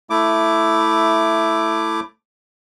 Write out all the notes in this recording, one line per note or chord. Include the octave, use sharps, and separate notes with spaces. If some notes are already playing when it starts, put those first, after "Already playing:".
A3 E4 D6